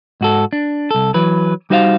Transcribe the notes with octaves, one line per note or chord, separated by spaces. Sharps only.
G#2 F#4 A4
D4
C2 A4
E3 F#3 B4
G3 D#4 F#4 C5 E5 F5